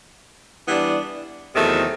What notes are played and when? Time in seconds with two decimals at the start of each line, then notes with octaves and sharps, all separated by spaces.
0.66 E3 G3 B3 D4
1.53 E2 C3 D#3 F#3 A3